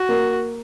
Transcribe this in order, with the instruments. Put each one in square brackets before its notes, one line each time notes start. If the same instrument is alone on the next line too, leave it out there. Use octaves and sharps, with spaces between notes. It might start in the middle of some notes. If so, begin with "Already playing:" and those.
Already playing: [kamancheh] F#4
[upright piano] A#3